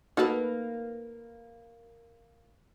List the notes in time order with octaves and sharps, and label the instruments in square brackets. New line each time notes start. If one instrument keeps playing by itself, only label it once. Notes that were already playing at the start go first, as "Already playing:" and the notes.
[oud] A#3 B4 [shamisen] D#4 F#4 A4